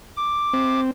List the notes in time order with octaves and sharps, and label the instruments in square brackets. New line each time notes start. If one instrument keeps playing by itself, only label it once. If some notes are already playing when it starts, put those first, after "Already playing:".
[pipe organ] D6
[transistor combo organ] C4